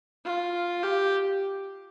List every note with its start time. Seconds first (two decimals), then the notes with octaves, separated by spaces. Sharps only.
0.25 F4
0.83 G4